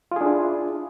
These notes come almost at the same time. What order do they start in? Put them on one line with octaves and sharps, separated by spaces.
F4 G#4 D4 E4